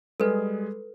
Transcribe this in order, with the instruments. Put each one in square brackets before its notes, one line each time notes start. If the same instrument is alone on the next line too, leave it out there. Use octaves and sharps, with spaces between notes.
[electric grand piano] G3 G#3 G#4 [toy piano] A4 B4